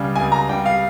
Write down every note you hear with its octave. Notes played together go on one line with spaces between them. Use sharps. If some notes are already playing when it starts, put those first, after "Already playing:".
Already playing: C#2 C#3 G3
C#2 G#5
A#5
C#3 G3 G5
F5